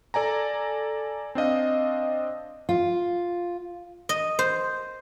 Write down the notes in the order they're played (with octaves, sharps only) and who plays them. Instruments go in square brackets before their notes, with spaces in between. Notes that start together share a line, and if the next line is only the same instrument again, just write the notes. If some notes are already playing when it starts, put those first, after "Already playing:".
[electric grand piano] A4 D5 G#5 A#5
C4 D4 D#5 F5
[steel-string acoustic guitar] F4
[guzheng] D#5
C5